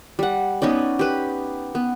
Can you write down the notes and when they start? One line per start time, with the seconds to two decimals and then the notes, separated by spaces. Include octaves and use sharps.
0.19 G3 F#5
0.62 B3 C#4 D#4 D5
0.99 G4 B4
1.75 B3